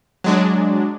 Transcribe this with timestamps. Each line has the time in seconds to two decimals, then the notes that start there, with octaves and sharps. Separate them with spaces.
0.24 F#3 G#3 D4